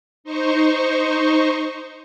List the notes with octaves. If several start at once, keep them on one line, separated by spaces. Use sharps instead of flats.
D#4 C5 C#6